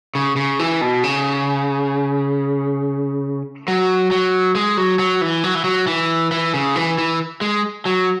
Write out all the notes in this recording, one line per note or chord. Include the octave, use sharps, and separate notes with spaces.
C#3
C#3
E3
B2
C#3
F#3
F#3
G#3
F#3
F#3
E3
F#3
E3
F#3
E3
E3
C#3
E3
E3
G#3
F#3